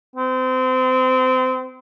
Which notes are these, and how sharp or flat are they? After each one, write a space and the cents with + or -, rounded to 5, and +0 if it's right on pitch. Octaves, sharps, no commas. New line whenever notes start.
C4 -30